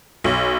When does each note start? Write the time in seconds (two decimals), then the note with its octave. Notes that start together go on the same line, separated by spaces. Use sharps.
0.24 B1